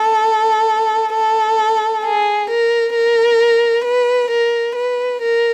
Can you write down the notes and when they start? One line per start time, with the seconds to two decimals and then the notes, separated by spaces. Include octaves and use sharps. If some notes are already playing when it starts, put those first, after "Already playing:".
Already playing: A4
1.13 A4
2.03 G#4
2.49 A#4
2.94 A#4
3.84 B4
4.29 A#4
4.74 B4
5.20 A#4